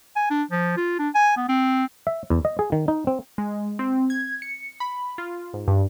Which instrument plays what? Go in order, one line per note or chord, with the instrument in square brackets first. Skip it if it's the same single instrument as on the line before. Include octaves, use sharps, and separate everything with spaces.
[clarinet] G#5
D4
F3
F4
D4
G#5
B3
C4
[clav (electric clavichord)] E5
E2
D#5
G#4
D#3
D#4
C4
[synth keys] G#3
C4
G#6
C#7
B5
F4
G#2
G2